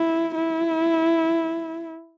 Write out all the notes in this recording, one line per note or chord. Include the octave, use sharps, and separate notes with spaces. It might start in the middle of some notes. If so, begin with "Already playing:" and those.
Already playing: E4
E4